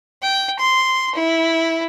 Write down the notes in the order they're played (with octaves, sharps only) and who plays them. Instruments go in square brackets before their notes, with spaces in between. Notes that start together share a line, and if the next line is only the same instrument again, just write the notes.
[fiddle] G5
C6
E4